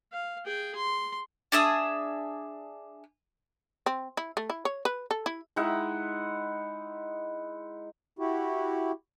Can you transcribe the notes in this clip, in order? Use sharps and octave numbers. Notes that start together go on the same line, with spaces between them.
F5
G#4 G5
C6
D4 G#4 E5 D#6
C4
E4
A3
E4
C#5
B4
A4
E4
G#3 D#4 E4 F#5
E4 F#4 G4